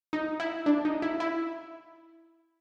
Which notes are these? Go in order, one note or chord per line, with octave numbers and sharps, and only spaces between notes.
D#4
E4
D4
D#4
E4
E4